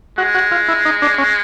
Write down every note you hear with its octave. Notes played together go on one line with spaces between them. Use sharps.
G#3 F#4
F#4
F4
E4
D#4
D4
C#4